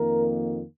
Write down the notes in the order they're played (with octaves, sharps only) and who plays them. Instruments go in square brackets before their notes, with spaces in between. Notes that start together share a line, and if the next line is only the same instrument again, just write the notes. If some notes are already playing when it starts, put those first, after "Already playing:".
Already playing: [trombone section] F2 D#3 A#3 A#4